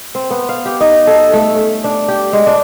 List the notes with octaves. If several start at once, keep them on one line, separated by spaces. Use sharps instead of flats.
C4
B3
F5
G4
D#4
A4
A3
C#4
D4
G4
G#3
D4